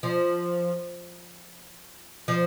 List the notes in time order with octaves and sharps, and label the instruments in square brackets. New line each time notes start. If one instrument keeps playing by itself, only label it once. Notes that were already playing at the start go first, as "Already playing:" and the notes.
[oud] F3
F3